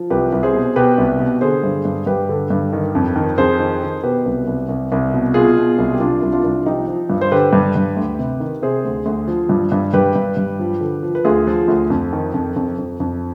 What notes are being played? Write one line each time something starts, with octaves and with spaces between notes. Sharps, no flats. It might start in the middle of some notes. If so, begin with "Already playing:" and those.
Already playing: F3
C2 G4 B4
C2
G#4 C5
B2
B2 G4 B4
C2
B2
D3 G#4 C5
G2
G2
G2 G4 B4
D3
G2
D#3
F2
D#3
F2 G#4 C5
D#3
D#3
B2 G4 B4
C2
C2
C2
C2
B2
B2 F4 G#4
B2
C2
G4
C2 D4 F4
C2
D4 F4
C2
F3 D#4 G4
F3
G2
C5
D3 G4 B4
G2
G2
D2
C3
D#3
C3 G#4 C5
D2
D2
F3
G2
G2
G2 G4 B4
G2
G2
F3
D3
F3
B4
D2 F4 G#4
F3
D2
F2
D#3
F2
F2
F2
F2